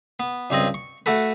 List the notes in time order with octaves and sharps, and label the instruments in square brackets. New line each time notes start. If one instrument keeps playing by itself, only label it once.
[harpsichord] B3
C#2 G2 C4 D#5
C#6
A3 F#4 A4 B4